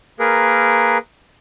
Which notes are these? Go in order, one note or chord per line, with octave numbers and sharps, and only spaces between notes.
A#3 G#4 A#4 B4